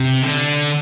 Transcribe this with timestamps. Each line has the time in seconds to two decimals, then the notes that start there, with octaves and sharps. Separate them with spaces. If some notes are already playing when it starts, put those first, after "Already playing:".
Already playing: C3
0.23 D3